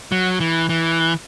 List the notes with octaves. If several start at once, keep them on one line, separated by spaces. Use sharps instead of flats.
F#3
E3
E3